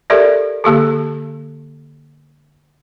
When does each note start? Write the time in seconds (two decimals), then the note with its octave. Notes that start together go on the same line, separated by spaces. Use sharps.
0.10 G4 A4 A#4 D5 E5
0.64 D3 A#3 G4 A4